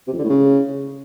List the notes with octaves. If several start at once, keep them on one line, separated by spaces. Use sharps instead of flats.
C3
F2
D3
A2
C#3